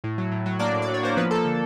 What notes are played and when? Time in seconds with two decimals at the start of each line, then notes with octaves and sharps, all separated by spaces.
0.04 A2
0.18 F#3
0.32 A2
0.46 F#3
0.59 A#3 D4 D5
0.74 A2
0.82 D5
0.89 F#3
0.94 C#5
1.03 A#3 C5
1.17 F3 B3 B4
1.31 F3 A4
1.45 D3